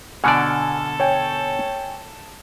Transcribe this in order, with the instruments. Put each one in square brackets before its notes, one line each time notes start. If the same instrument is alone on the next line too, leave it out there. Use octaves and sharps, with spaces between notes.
[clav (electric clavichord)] B2 D3 D5 [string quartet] A4 [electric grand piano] G#5 F6 C#7
[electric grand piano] C#5 G5 G#5